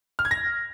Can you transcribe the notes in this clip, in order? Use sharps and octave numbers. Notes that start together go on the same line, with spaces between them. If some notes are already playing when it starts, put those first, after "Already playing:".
F6
G#6
A#6